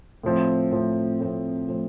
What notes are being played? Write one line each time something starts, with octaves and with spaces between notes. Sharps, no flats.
A2 F3 C4
A2 F3 C4
A2 F3 C4
A2 F3 C4